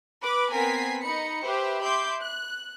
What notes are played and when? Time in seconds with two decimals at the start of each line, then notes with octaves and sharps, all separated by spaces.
0.22 B4 D6
0.52 B3 C4 A#4 G#5 B6 C7
1.03 D#4 B5 C#7
1.44 G4 B4 C5 E5
1.82 E5 B5 C6 D6 G6
2.22 F#6